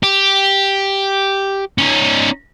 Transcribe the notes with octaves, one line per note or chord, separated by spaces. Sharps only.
G4
C#4 D#4